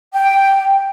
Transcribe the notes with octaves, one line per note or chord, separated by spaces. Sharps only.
G5